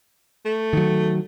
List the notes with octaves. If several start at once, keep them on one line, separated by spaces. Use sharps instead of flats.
A3
D#3 F#3